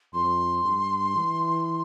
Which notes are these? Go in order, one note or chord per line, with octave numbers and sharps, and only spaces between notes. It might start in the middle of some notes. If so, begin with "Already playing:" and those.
F2 C6
G2
E3